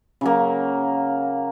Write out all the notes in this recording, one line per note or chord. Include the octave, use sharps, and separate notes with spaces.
C#3 F#3 A#3